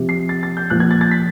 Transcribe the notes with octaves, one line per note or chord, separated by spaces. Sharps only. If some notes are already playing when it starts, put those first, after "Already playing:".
Already playing: C3 F3
C7
A6
A6
G6
A#2 F3 F#6
G#6
A6
A6
B6